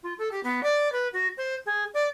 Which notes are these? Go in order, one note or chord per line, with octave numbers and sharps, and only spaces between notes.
F4
A4
G4
B3
D5
B4
F#4
C5
G#4
D5